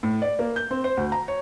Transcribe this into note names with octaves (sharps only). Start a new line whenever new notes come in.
A2
D5
A#3
G6
C4
C5
D2
A#5
C#5